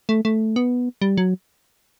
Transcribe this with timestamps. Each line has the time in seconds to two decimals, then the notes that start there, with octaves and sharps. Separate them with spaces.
0.09 A3
0.25 A3
0.56 B3
1.02 G3
1.18 F#3